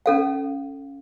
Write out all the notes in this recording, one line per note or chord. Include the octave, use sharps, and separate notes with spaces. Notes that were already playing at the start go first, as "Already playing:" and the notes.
C#4 A4 F5